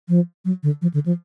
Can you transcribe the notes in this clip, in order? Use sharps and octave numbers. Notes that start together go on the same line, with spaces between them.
F3
F#3
D3
F3
D3
F3